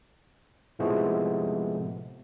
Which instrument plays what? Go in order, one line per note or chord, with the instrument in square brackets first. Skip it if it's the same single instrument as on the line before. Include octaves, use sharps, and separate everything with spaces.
[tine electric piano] A2 C3 F3 G#3 A3 B3